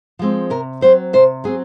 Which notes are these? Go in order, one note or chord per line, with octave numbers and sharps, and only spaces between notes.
F3 G#3 C4
C3 A#4
F#3 C4 C5
C3 C5
F#3 C4 G#4